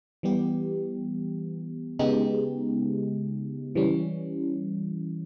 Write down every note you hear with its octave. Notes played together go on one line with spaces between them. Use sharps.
E3 G3 B3 G4
C#3 G#3 B3 D#4 G4
E3 G3 C#4